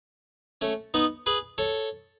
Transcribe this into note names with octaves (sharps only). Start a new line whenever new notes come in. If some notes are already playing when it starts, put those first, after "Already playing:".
A3 C#4
B3 D#4
G#4 B4
A4 C#5